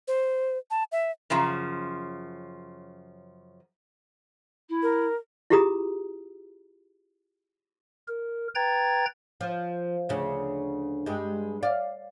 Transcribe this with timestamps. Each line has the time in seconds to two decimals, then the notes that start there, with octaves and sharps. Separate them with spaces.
0.08 C5
0.71 A5
0.92 E5
1.30 F#2 C#3 F3
4.69 E4
4.83 A#4
5.50 E4 F4 G4 G#4 A#5 D#6
8.08 A#4
8.55 B4 G5 A#5 G#6 A6
9.41 F3
10.09 D2 C#3
11.06 G2 G#3
11.63 D5 F5